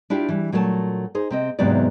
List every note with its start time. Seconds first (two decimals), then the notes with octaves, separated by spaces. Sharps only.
0.10 D4 E4 F4 G4
0.29 E3 G3
0.52 A#2 F#3 A3 B4 A5
1.15 D#4 G#4 C5
1.31 C3 C4 D#5
1.59 E2 G#2 C3 F#3 B3 D5